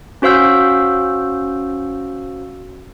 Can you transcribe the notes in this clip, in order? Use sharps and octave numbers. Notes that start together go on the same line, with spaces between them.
C#4 F#4 C5 F5 E6 G6